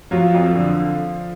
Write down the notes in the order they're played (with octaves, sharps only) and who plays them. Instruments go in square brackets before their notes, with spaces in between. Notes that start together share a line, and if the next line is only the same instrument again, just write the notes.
[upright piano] F3 F#3 F4
F2
D3